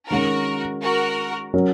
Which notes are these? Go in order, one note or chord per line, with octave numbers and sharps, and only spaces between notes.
D#3 G#3 C#4 F#4 A#4
F#4 A#4
F#3 C#4 A#4